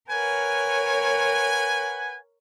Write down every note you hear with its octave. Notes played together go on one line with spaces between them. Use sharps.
A#4 B4 C#5 F#5 G#5